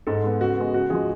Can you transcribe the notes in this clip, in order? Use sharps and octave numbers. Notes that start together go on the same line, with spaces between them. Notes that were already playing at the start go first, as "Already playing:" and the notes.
G#2 A4
G#3 B3
C#3 F#4
G#3 B3
C#3 F#4
F3 G#3 G#4